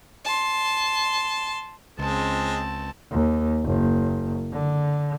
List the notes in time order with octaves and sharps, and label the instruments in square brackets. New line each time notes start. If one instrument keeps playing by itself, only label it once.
[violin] A5 C6
[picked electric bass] C#2 [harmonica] G#3 C5 [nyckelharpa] C4 A5
[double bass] D#2
F#1
D3